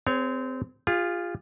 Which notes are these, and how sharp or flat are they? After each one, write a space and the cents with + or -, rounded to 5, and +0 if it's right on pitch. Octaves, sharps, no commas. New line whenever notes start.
C4 -25 G#4 +0 C#5 +10
F4 +0 G#4 -45